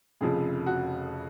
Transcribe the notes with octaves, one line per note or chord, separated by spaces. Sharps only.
F1 F2 C#3 F3 G#4
F#4